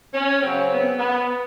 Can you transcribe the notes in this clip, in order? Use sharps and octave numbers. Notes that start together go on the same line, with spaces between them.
C#4
C#3 F#3 C4
B3
B3